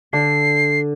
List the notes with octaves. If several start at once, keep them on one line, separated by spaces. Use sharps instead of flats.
D3 C7